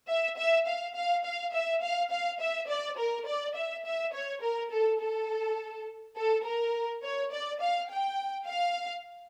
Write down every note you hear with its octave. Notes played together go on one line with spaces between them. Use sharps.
E5
E5
F5
F5
F5
E5
F5
F5
E5
D5
A#4
D5
E5
E5
C#5
A#4
A4
A4
A4
A#4
C#5
D5
F5
G5
F5